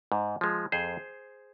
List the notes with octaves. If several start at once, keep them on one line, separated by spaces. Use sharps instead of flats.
G#2
F3 G#3
F2 G#4 C5